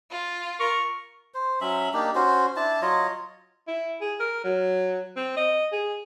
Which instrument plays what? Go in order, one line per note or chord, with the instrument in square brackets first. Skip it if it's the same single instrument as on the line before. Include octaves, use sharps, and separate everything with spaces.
[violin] F4
[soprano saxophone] A#4 [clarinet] C#6
[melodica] C5
F#3 C#4 E5 B5
A#3 D4 D#4 G4
C#4 F#4 C5
D4 E4 A5
F#3 F4 C#5 D#5
[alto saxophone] E4
G#4
A#4
F#3
C4
D#5
G#4